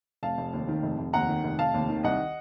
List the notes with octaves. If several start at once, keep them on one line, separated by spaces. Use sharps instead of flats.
F1 F5 A5
F1
D#2
D#3
F1
F1
D#2 F#5 A#5
D#3
F1
F1 F5 A5
D#2
D#3
C2 D#5 F#5